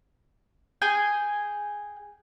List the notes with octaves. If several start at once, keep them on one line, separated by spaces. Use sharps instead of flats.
G#4 G5 G#5